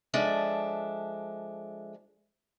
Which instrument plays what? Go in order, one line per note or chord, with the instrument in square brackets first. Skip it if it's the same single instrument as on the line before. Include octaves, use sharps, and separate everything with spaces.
[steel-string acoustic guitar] F3 G#3 D4 A4 E5